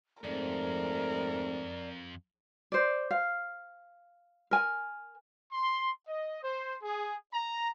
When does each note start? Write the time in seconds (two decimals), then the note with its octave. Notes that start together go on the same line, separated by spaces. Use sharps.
0.24 F2 G#2 A3 C4 A#4 D5
2.72 C5 D5
3.11 F5
4.51 A#4 G#5
5.52 C6
6.08 D#5
6.43 C5
6.82 G#4
7.33 A#5